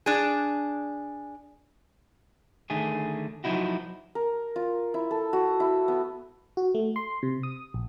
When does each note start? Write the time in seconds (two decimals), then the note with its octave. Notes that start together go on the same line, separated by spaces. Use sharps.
0.06 D4 G#4
2.70 D3 D#3 A3 G#4
3.44 F3 F#3 D#4 E4 F#4
4.15 A#4
4.56 F4
4.94 E4
5.11 A4
5.33 F#4
5.60 E4
5.88 B3
6.57 F#4
6.75 A3
6.96 C6
7.23 C3
7.43 D#6
7.74 A#1